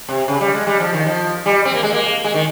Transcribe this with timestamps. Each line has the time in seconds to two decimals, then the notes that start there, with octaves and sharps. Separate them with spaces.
0.09 C3
0.28 C#3
0.41 G3
0.54 G#3
0.67 G3
0.80 F3
0.93 D#3
1.06 F3
1.46 G3
1.65 C4
1.75 A#3
1.83 G#3
1.93 A#3
2.24 G#3
2.34 D#3